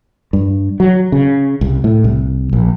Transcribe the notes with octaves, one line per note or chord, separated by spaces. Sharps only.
G2
F#3
C#3
C2
A2
C2
A#1